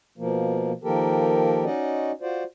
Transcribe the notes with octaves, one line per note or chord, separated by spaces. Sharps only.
B2 F3 A#3
D#3 F3 A#3 G4 A4 A#4
C#4 D#4 F#4 D5 D#5
F4 F#4 C5 D5